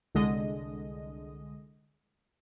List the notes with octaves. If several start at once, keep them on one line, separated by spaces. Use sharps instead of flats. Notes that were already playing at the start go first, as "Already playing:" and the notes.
C2 D3 G#3 D#5